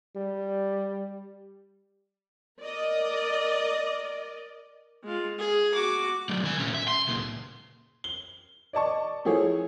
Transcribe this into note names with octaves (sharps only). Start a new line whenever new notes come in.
G3
A#4 D5 D#5
G#3 F4
G#4
F#4 D6
F#3 A3
D#3 G#5
A#2 C#4
E5
C6
C#2 A#2
G7
D5 D#5 A5 C#6
F3 A3 E4 G#4 A4 C#5